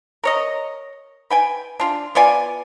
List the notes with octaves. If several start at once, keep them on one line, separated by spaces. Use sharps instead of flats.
A#4 C#5 D#5
B4 G5 G#5
D4 F4
B3 F4 D5 G#5